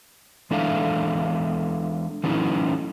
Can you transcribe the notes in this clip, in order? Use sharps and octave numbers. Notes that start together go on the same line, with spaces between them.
E3 G#3 D4 A4 E5 F5
E3 F#3 A3 C#4 D#4 E4